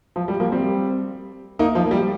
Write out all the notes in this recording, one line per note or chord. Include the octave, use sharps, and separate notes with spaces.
F3
G3
F3 A#3
G3 C4
A#3 D#4
F3
A#3
G3